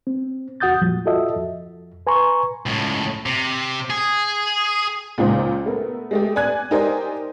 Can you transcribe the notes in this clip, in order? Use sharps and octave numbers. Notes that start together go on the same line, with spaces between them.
C4
E2 F#4 F#5 D#6 G6 A6
F2 A#2 F3 G3
F4 F#4 A4 D#5 E5
F2
B4 G#5 A#5 C6 C#6
C#2 A2
C3
G#4
C#2 A#2 D#4 C5
A3 B3 A#4
G#3 A3 G4
D5 G#5 F#6 G#6
D#4 G4 A#4 C5 D5 G#5